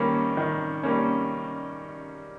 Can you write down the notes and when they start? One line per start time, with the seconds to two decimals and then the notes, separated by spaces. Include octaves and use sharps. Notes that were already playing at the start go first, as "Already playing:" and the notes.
Already playing: D#3 G3 A#3 C#4
0.37 D#3
0.83 G3 A#3 C#4